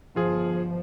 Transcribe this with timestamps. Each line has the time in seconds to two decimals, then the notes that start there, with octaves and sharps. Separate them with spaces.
0.16 G1 F3 F4 G#4